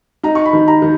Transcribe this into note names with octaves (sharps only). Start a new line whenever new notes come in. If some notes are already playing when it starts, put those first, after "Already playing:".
D#4 A#5
C#6
B5
D#3
A#5
D#3